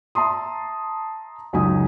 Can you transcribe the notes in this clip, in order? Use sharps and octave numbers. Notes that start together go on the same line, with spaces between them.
E5 A5 A#5 C6 D#6
C#2 F#2 D#4 G#5 D#6